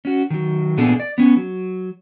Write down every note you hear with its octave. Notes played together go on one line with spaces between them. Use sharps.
C#4 F#4
D#3 F#3
A#2 B3 D4 G#4 A4
D5
B3 C#4
F#3